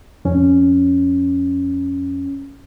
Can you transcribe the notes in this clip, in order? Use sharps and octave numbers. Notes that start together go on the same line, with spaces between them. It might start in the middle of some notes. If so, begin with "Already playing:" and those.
F2 C#4